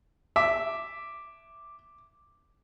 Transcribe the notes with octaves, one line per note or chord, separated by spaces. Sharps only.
E5 D6